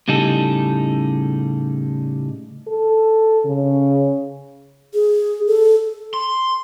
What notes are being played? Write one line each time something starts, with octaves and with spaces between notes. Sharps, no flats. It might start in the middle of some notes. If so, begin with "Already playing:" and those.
A2 C#3 G3 D#4 G#4 A4
A4
C#3
G#4
A4
C6